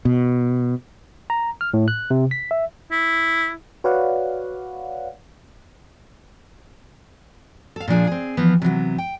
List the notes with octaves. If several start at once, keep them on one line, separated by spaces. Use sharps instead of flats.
B2
A#5
F6
A2
F#6
C3
B6
E5
E4
F#4 B4 C#5 D5 F5 F#5
A4 F5
A#2 F3 D4 G#4
C4 G#4
E3 F3 B3 F4
C3 E3 F#3 B3
G5